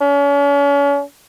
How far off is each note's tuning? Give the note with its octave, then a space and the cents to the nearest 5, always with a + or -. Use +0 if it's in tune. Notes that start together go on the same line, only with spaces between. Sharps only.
C#4 +40